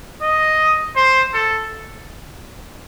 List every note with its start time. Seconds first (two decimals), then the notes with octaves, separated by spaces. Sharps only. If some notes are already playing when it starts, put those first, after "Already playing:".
0.22 D#5
0.96 C5
1.34 A4